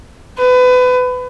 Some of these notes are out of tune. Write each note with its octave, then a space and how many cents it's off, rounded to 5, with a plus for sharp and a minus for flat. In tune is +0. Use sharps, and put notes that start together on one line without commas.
B4 +30